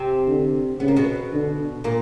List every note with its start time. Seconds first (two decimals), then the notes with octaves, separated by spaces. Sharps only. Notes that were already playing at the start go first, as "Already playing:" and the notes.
Already playing: C3 C4
0.27 D3
0.80 C#3 B3
0.88 A#3
0.96 B2 B3
1.33 D3
1.84 A#2 A#3